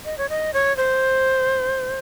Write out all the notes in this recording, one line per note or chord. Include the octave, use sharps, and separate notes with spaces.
D#5
C#5
D#5
C#5
C5